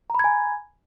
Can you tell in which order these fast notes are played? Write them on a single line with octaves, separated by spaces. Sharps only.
A#5 B5 G#6 G#5